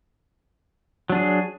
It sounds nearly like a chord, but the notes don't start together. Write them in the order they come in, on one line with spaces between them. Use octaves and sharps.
F#3 D4 G#4